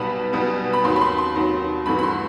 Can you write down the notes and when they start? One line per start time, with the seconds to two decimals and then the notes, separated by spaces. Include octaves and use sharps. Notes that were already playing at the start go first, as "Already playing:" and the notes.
Already playing: B1 B2 G3 B3 B5
0.33 B1 B2 G3 B3
0.73 B5
0.84 D#2 D#3 F#3 C6
0.96 B5
1.01 C6
1.18 C6
1.35 D#2 D#3 F#3
1.86 A1 G2 E3 A3 B5
1.99 B5
2.03 C6